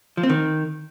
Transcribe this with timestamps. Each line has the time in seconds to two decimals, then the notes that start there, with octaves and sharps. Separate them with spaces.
0.17 F3
0.23 C4
0.29 D#3